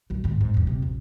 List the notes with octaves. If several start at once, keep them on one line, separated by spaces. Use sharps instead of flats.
B1 F#2
D#2 G#2
G#2
D#1 E2
E2 C3
A#1